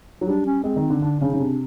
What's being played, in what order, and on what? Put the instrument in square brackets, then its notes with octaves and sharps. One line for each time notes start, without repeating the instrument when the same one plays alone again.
[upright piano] F#3
[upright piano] G3 [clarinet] D4
[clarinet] C#4
[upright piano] G#3 [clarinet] C4
[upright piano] D#3
D3
[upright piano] D3 [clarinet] D4
[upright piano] C#3 [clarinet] D4
[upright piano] C#3 [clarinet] D#4
[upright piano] C3 [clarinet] D4